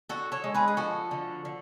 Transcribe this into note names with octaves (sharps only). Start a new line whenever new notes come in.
D3 F#4 A4
A4 C#5
G#3
G#4 B4
G#4
F3 F#4 A4
D3
D3